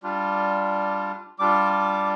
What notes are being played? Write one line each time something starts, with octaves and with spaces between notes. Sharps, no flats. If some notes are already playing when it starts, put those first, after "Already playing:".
G3 D4 F4
G3 D4 F4 D6
D6